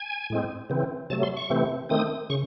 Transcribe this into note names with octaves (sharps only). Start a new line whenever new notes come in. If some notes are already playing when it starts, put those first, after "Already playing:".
Already playing: G#5
A2 G#3 C4
C#3 E3 C4
C3 F#3 A3 A5
C6
C#6
C3 E3 A3 C4
D#3 A3 C4 D#6
C#3 C#6